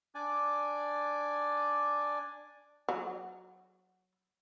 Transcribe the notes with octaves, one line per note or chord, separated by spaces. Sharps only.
D4 D5 G#5
F#3